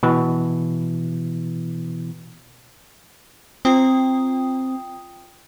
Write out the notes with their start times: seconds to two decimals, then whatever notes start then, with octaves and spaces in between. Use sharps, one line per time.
0.03 B2 E3
3.65 C4 F4 G5 D#6